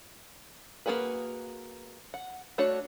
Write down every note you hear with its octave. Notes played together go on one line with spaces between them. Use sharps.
A#3 E4 F#4 G#4 B4
F#5
A3 D4 F#4 C#5